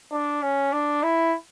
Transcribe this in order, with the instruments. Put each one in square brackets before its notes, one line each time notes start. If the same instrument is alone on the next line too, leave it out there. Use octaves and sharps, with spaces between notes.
[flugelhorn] D4
C#4
D4
E4